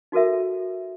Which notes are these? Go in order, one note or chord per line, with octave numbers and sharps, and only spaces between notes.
D#4 F#4 A4 A#4 E5